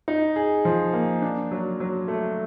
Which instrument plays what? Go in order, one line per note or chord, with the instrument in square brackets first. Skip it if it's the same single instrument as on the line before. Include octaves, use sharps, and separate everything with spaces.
[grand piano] D#4
G#4
F3
A#3
D4
F#3
F#3
A3